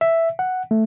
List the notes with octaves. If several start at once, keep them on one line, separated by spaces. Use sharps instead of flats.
E5
F#5
A3